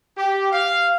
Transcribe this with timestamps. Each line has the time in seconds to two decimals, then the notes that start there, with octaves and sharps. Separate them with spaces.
0.16 G4
0.51 F5